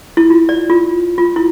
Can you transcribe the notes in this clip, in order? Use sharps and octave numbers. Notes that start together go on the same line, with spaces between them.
E4
F4
D5
F4
F4
E4